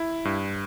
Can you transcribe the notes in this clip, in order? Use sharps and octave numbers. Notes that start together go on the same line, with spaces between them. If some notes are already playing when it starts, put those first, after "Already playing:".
Already playing: E4
G2